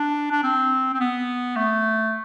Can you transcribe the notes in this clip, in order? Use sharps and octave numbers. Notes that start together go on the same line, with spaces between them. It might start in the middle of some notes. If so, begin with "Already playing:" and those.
Already playing: D4
D4
C4
C4
B3
A3